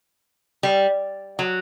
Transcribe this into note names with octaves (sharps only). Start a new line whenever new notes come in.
G3
F#3